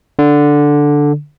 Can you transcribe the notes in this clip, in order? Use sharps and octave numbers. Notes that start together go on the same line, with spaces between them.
D3